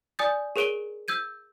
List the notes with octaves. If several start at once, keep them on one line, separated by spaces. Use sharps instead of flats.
D5 G#5 D#6 G6 A6
G#4 A#4 C#5 D7 D#7 G7
E6 G6 G#6 D#7